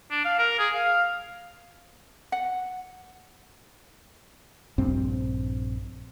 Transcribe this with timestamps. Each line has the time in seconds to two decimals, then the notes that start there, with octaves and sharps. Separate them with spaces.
0.11 D4
0.25 F5
0.38 A#4
0.59 G#4
0.74 F5
2.32 F#5
4.78 A#1 G2 C4